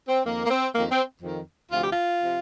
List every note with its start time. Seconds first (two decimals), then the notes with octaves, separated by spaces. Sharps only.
0.08 C4
0.24 F2 D#3 A#3
0.44 A#3
0.49 C4
0.73 F2 D#3 A#3
0.90 C4
1.21 F2 D#3
1.70 D2 C3 F3 F4
1.80 G4
1.90 F4
2.21 C3 F3